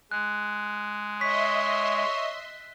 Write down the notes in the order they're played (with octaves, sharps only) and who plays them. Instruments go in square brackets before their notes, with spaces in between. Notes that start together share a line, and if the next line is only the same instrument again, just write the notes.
[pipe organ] G#3 [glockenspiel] F#6
[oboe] C#5 [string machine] D#5 E5 C6 [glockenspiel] B6